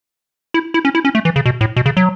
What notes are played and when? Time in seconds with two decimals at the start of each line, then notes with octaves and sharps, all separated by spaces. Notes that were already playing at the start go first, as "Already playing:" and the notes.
0.54 E4
0.74 E4
0.85 C#4
0.95 E4
1.05 C#4
1.15 A3
1.25 E3
1.36 C#3
1.46 B2
1.61 A2
1.76 B2
1.86 C#3
1.97 F#3